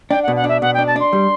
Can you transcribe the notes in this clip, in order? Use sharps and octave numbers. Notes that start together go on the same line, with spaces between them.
D4 G5
F#5
B2
F#5
D4 E5
B2 F#5
G5
D4
A5
D4 C6
G3